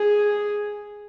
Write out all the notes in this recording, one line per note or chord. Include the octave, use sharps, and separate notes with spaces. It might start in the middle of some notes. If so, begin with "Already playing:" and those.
Already playing: G#4